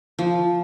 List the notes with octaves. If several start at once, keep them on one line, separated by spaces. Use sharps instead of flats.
F3